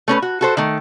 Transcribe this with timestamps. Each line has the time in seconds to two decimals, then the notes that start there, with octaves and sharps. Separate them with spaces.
0.08 A3 C#4 A#4 B4
0.22 F#4
0.41 F#4 A4 C5
0.57 D#3 A3